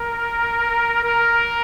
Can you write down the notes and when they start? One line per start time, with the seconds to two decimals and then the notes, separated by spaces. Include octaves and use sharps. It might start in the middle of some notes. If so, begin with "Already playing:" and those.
Already playing: A#4
1.05 A#4